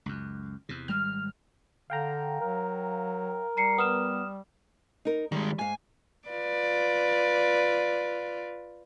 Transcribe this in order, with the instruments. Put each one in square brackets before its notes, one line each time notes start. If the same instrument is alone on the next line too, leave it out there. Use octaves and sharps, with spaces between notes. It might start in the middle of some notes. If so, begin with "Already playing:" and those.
[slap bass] C#2 F#2
E2 C3
[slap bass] G#1 G3 G#3 [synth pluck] F6
[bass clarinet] D3 [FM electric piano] F5 G5 A#5
[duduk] F#3 [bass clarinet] A#4
[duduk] G3 [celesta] A#5 C7 C#7
[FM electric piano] B3 [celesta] D#6 F6 E7
[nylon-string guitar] D#4 A#4
[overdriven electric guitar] D#3 G#3 [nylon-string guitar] G3
[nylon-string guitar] G#2 F5 [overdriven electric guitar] G#5
[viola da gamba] F4 B4 D5